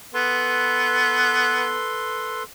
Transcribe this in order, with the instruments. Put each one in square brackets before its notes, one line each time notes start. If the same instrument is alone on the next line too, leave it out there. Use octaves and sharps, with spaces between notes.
[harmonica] B3 [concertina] A4 B4 C6